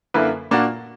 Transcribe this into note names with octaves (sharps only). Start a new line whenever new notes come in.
F#2 D3 A#3 E4 B4
A#2 A#3 D4 F#4